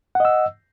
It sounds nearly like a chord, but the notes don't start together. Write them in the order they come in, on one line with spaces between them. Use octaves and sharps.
F#5 D#5 E6